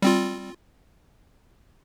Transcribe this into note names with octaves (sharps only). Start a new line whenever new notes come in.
G3 C4 F4